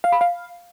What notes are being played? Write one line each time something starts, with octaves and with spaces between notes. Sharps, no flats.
F5
B5
F5